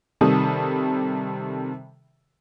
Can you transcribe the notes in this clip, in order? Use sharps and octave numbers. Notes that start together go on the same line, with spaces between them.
C3 D#3 G3 A4 D#6